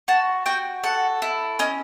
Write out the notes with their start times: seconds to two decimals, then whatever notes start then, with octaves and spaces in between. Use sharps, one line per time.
0.08 F#4 A5
0.46 F#4 G5
0.83 A4 F#5
1.22 E4
1.59 C#4 D#5